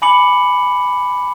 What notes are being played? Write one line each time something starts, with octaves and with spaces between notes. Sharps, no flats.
G#5 B5 D6 C#7 F#7